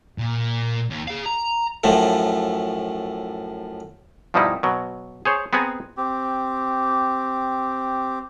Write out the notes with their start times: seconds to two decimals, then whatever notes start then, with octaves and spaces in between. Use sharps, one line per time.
0.18 A#2
0.90 D#2
1.07 G#4 F5
1.26 A#5
1.84 F#2 A2 F3 A3
4.34 G2 B2 F3 G3 D#4 E4
4.63 B2 F#3
5.25 G#4 C5 C#5
5.53 B3 C4 G#4 F#5 G#5 A#5
5.97 C4 G4